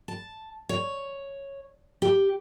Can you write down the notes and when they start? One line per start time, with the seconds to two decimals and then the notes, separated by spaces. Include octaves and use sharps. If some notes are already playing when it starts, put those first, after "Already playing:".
0.08 A5
0.69 C#5
2.02 G4